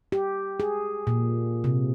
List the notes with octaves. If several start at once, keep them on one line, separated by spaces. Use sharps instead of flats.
G4
G#4
A#2
C3